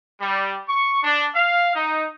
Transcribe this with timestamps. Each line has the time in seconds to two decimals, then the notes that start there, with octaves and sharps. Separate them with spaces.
0.21 G3
0.69 C#6
1.03 D4
1.36 F5
1.75 D#4